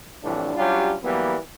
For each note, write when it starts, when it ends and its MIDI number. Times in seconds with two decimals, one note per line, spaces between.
0.23 0.52 36
0.23 0.52 41
0.23 0.52 45
0.23 0.52 52
0.23 0.52 62
0.55 0.95 54
0.55 0.95 55
0.55 0.95 61
0.55 0.95 62
0.55 0.95 65
0.55 0.95 67
1.03 1.36 52
1.03 1.36 54
1.03 1.36 55
1.03 1.36 58
1.03 1.36 59